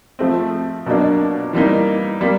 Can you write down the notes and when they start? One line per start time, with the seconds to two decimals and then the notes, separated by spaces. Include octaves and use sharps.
0.19 F3 A3 C4
0.86 B2 F#3 A#3 D4
1.53 E3 G3 A#3 D#4
2.21 G3 A#3